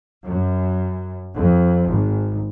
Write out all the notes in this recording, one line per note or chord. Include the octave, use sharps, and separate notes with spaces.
F#2
F2
G#1